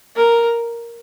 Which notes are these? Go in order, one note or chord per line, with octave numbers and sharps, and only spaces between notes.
A#4